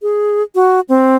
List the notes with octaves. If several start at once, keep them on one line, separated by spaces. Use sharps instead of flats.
G#4
F#4
C4